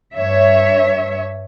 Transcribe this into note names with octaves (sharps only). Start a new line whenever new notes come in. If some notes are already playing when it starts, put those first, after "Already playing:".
G2 C#5 E5